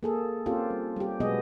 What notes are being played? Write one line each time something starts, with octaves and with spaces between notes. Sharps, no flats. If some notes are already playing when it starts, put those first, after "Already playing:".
A#3 G#4 A4
A#3 C4 C#4 F4 G4 A4
G3
G3 G4
B2 F#3 G#3 B3 G#4 D#5